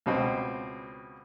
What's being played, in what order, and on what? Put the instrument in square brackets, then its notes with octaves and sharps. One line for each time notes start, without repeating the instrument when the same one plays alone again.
[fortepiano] C#2 B2 C4